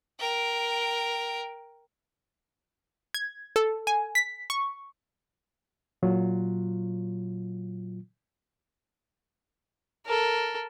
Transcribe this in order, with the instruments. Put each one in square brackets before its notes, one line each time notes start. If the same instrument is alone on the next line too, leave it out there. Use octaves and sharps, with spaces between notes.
[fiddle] A#4 G5
[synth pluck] G#6
A4
G#5
B6
C#6
[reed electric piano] A#2 F#3 F4
[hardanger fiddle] A4 A#4